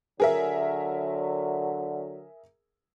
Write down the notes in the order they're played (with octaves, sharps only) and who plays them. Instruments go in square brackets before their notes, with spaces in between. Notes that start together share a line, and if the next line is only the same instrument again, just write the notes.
[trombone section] D3 F#3 [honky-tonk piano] G#4 A#4 E5